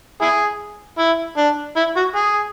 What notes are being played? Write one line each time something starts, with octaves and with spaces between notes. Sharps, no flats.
E4 G#4
E4
D4
E4
F#4
G#4